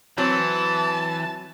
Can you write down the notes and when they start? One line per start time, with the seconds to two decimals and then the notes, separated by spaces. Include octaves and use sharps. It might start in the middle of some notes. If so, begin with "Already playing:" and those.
0.18 E3 F#3 C4 A5